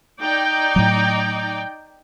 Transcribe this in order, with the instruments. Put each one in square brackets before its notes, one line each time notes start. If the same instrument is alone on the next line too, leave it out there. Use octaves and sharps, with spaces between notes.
[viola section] D#4 D5 G5
[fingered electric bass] A2 F#3